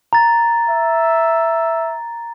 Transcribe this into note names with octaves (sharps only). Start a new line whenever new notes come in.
A#5 A6
E5